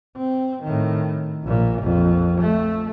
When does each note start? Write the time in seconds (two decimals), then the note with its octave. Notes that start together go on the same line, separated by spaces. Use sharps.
0.17 C4
0.63 A2 D#3
1.44 A#1 A#2
1.81 A#1 F2
2.41 A3